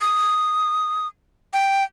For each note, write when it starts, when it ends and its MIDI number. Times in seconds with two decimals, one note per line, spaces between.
0.01 1.08 87
1.53 1.84 79